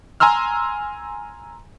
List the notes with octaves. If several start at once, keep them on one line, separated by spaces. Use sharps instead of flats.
G#5 A#5 C6 E6 F6